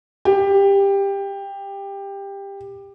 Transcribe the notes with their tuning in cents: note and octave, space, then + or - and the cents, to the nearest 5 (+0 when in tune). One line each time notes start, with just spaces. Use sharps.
G4 +15